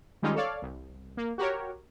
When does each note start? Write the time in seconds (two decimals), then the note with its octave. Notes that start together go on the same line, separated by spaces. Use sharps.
0.22 D#3 G3 G#3 C#4 D#4 F4
0.35 A4 C#5 D5 F5
0.62 C2
1.17 A#3
1.38 F#4 G4 A#4 C#5